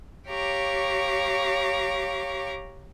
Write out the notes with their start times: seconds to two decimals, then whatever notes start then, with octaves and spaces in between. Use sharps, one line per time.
0.29 G4 C#5 F5 A#5 C#6 D6